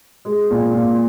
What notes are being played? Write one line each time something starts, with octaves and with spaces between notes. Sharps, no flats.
G#3
A#2
A#2